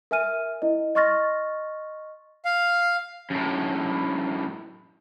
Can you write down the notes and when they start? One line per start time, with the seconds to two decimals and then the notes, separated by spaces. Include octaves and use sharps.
0.11 A#4 E5 G#5 F6 D#7
0.62 E4 D#5
0.95 D#5 C6 C#6 F6 A6 A#6
2.45 F5
3.31 F#2 A2